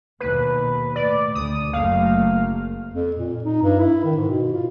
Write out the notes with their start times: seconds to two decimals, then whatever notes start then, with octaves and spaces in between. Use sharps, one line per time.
0.20 D#2 B2 B4
0.96 A2 D5
1.35 D2 D#6
1.73 F#1 A3 A#3 F5
2.94 F2
3.16 A#2
3.44 D#4
3.62 G2
3.79 E4
4.04 D#3
4.15 G#2
4.29 B2
4.53 F4